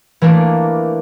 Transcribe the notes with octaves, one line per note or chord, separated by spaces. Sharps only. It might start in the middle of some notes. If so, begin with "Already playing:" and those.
E3 A3 A#3 D4